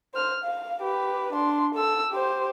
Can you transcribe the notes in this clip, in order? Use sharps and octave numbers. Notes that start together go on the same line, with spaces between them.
C5 F6
F5
G4 B4
D4 C6
A4 E6
G4 C5